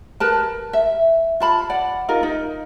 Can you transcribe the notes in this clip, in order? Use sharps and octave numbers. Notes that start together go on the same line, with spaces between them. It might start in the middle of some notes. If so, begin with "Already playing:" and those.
A#4 B4 A5
E5
F4 A5 B5
D5 F#5
D#4 F4 A#4
D#4